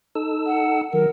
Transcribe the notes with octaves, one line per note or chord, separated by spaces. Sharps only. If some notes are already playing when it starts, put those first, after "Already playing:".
D#4 A4 E6
F#5
D#3 F#3 A#4